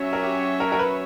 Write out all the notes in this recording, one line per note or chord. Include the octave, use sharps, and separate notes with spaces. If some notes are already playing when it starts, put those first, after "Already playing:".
Already playing: F#3 C#4 F#4 C#5 E5
A#4
G4
A#4
A#4
B4